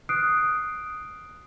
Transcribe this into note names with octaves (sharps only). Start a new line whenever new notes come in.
D#6 F6 F#6 C7 D7